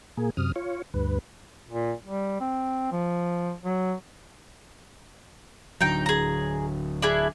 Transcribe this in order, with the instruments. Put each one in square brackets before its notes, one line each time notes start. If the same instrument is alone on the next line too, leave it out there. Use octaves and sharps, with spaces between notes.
[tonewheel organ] A#2 A#3 G#4
F#2 C3 D#6 F6
F4 C#5
D2 G2 B4
[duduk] A#2
G3
C4
F3
F#3
[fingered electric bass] D1 D3 F#3 [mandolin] D#4 G5
[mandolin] G#4 A#5
D4 E4 G#4